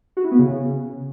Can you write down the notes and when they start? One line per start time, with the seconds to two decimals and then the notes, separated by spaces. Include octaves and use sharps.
0.17 F#4
0.24 E4
0.31 B3
0.39 C#3